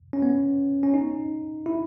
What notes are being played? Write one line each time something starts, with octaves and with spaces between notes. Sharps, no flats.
C#4
B3
C#4
D#4
E4